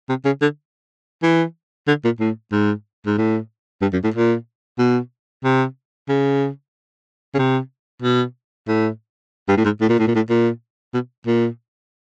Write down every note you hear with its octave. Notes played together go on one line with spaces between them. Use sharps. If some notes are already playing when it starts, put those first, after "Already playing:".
C3
C#3
D3
E3
D3
A#2
A2
G#2
G#2
A2
G2
F#2
A2
A#2
B2
C3
C#3
C#3
C3
B2
A2
G2
A2
G#2
A2
A#2
A2
A#2
A2
A#2
B2
A#2